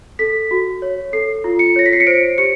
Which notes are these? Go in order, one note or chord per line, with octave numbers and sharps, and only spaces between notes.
A4 B6
F#4
C#5
A4 C7
F4
C#7
C#5 A#6
B6
C7
C#7
C5 D7
G4 C#7